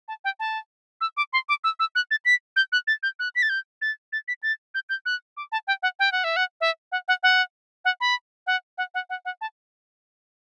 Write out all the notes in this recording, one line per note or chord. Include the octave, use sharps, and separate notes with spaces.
A5
G5
A5
E6
D6
C6
D6
E6
E6
F#6
A6
B6
G6
F#6
A6
G6
F#6
B6
A6
G6
A6
A6
B6
A6
G6
G6
F#6
D6
A5
G5
F#5
G5
F#5
E5
F#5
E5
F#5
F#5
F#5
F#5
B5
F#5
F#5
F#5
F#5
F#5
A5